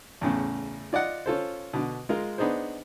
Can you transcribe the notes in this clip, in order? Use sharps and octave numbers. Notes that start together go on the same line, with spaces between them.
E2 A2 C#3
F4 D5 D#5 F#5
C#4 F4 A4 C5
B2 D3
G#3 F4 A#4
B3 D4 D#4 G#4 C5